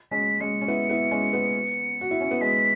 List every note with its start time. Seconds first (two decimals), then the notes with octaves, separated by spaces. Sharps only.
0.11 G#3 C#4 B6
0.40 G#3 C#4 C#7
0.62 C#4
0.68 B3 E4
0.90 B3 E4
1.11 G#3 C#4
1.33 B3
2.01 F#4
2.11 E4
2.21 C#4
2.31 B3
2.41 G#3 B6